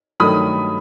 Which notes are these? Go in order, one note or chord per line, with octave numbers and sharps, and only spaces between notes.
G2 D#3 F#3 A3 B5 D#6